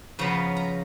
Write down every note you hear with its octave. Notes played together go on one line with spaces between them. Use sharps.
C#3 F3 B3 A#5
A#5